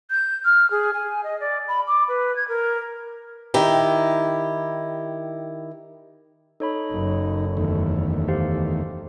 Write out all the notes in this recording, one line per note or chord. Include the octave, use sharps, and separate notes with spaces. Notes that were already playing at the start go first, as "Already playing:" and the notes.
G6
F6
G#4
G#5
D#5
D5
B5
D6
B4
G#6
A#4
D#3 E4 G4
D#4 A4 C#5 B5
F#1
E2 D#3 A3
G4 C5 F5